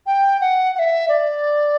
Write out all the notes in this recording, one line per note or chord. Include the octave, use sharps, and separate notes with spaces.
G5
F#5
F#5
E5
D5